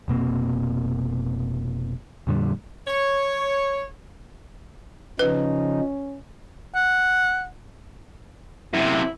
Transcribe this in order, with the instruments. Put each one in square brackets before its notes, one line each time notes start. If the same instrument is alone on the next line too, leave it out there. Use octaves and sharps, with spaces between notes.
[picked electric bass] F1 B2 A#3 C4
F2 A#2 D3 G3
[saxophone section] C#5
[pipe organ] C#3 F3 D#4 [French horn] C#4 [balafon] B4
[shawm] F#5
[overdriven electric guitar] F#2 C3 [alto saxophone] E4